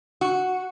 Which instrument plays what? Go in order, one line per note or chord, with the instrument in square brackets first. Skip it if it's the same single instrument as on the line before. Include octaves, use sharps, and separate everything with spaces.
[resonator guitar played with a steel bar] F#4